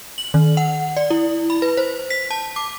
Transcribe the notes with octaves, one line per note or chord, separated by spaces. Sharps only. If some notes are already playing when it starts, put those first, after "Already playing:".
F#7
D#3
F#5
D5
E4
B5
B4
C5
B6
A5
D6